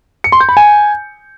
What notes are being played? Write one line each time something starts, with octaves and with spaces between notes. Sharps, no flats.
C#7
C6
G6
B5
G#5